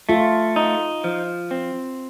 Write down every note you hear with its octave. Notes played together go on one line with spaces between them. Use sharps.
A3 F4
D#4
F3
C4